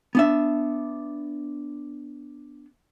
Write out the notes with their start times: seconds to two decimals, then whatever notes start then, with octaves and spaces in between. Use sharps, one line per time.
0.15 B3 D4 E5